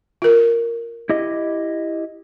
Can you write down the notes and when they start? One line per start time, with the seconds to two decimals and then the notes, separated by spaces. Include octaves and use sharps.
0.22 F4 A#4
1.09 E4 G4 D#5